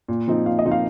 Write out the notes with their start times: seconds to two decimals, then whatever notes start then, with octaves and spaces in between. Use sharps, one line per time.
0.08 A#2
0.28 F3 C4 D#4
0.46 A#2 F5
0.59 D#5
0.65 F3 C4 D#4
0.71 F5